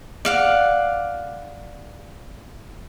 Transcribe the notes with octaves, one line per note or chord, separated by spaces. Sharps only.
D5 F5 F#5